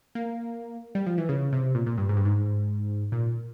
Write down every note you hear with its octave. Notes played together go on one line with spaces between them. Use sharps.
A#3
G3
F3
E3
C#3
C3
A#2
A#2
G2
G#2
G2
G#2
A#2